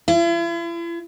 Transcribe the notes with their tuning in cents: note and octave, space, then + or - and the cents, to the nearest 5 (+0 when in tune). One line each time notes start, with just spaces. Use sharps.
E4 +45